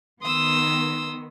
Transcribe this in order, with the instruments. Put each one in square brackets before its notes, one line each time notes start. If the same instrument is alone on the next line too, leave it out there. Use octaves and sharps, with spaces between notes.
[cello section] D#3 B3 [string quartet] C6 D#6 E6